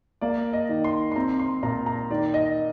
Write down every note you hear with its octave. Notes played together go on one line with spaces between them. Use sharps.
A#3 D5
D#5
D#3
C6
C6
C4 A#5
C6
A#2 A#5
A#5
D#3 D5
D#5